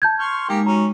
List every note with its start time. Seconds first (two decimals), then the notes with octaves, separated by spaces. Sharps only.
0.02 A5 G6 G#6
0.19 C6 C#6 F6
0.49 G#3 A#3 D#4 G4
0.66 F#3 C#4 A#5